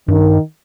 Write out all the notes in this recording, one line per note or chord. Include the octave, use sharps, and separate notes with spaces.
G2 D#3